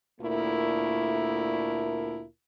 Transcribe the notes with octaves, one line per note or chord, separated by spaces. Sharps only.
D2 A#2 A3 E4 A#4